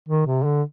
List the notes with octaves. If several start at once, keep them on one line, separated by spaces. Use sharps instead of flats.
D#3
C3
D3